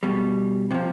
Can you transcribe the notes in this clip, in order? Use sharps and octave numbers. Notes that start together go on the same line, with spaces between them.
B2 G3
C3 F3 F#3